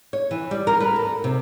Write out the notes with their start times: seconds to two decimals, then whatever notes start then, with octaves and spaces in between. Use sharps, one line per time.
0.13 C#5
0.31 E3
0.51 G3
0.67 A#4
0.80 B4
0.96 A4
1.24 C3